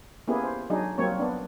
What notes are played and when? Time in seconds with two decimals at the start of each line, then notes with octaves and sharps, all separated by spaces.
0.28 A#3 B3 C#4 E4 G4 G#4
0.44 C5
0.70 F#3 D4 D#4 G#4
0.98 F#3 G3 A#3 C4 C#5
1.19 B3 D4